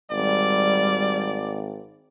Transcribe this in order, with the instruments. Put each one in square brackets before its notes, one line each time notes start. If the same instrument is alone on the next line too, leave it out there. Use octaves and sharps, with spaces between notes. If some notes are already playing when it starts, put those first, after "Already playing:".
[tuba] G#1 [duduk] G3 [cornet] D5